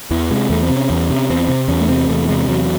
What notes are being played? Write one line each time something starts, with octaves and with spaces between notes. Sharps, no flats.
E2 E3
C3 G#3
E2 A3
C4
C3
C#4
E2
C3
E2 C4
C3
E2 C#4
A3
C3 C4
E2 A3
C3 G#3
G#3
E2 F#3